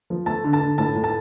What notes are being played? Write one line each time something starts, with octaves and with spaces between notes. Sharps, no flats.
F3
A3 A5
D3
A5
D3
A2 A5
A2
A5